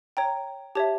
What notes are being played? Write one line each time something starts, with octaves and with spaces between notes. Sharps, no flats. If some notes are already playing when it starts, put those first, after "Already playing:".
C#5 G5 A#5
G4 C#5 E5 A5